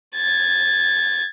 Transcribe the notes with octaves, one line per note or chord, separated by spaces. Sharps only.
G#6 A6